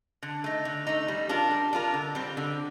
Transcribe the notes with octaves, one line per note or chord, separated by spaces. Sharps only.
D3
A3 D#4
D3
A3 D#4
G3
D4 F4 A#4
G3
D4 F4 A#4
D3
G3 C4
D3